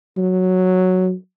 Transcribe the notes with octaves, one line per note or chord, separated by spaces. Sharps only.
F#3